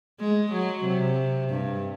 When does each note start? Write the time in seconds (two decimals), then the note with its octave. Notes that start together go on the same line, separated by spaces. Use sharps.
0.20 G#3
0.53 F#3
0.85 C3
1.50 G2